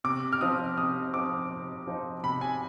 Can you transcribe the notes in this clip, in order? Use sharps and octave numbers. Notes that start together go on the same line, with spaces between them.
C3 D6
F6
F3 C4 D#4 D#6
C3 D#6
F3 C4 D#4 D6
C3
F3 C4 D#4
C3 B5
G#5